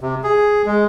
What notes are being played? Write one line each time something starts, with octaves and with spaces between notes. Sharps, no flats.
C3
G#4
G#3